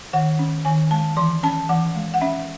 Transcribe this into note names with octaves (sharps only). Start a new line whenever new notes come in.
D#3 F#5
C#4
D#3 G#5
G#3 A5
E3 C6
C#4 A5
E3 F#5
G#3
F#5
C#4 E5